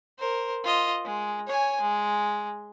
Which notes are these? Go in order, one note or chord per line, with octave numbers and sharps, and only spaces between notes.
A#4 C5
F4 D#5
G#3
C#5 G#5
G#3